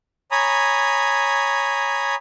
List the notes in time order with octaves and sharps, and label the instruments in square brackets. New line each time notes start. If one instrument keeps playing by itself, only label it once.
[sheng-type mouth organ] C#5 G#5 A#5 B5 D#6